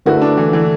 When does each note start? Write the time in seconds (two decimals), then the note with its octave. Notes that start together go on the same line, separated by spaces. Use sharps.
0.06 D3 A3 E4 F#4 B4
0.22 D4
0.37 E3
0.53 E3